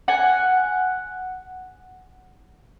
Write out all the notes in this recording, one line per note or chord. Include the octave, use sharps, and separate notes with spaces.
F#5 G#5